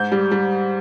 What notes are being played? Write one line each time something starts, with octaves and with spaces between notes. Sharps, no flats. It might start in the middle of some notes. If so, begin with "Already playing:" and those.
Already playing: G#2 G6
G3
G3